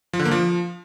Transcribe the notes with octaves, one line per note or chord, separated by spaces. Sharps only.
F3
D3
A#3
F3